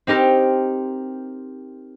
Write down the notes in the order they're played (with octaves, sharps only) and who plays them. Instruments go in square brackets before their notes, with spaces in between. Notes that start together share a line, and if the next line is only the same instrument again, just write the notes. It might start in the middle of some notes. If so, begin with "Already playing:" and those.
[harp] C4 D#4 G4 A#4